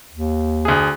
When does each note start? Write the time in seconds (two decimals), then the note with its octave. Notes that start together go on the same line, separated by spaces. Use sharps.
0.11 D#2
0.65 D2 G#4